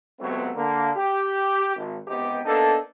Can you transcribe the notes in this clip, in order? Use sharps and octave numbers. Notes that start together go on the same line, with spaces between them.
C#2 C3 F#3 A3 B3 C4
D3 A#3
G4
G#1
C#2 C3 B3 D#4 G4
A#3 B3 D4 D#4 A4